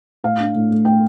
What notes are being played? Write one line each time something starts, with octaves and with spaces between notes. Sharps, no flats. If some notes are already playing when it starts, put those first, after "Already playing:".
A2 F5
D4
A2
A3
A2 G5